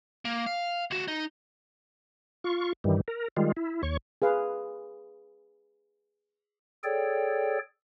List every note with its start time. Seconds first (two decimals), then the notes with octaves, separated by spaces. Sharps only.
0.25 A#3
0.46 F5
0.91 D2 F#4
1.08 D#4
2.44 F4 C#6
2.84 G2 D#3 E3 G3
3.08 A#4
3.37 D#3 G3 G#3 F4
3.57 E4
3.83 D#2 C#5 C#6
4.22 G#4 B4 F5
6.84 G#4 A4 C#5 D5 G5